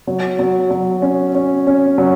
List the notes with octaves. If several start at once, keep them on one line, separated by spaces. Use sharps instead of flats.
F#3
F#3
F#3
C#4
C#4
C#4
F#3